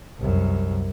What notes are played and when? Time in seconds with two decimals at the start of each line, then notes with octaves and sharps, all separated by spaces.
0.19 C2 F#2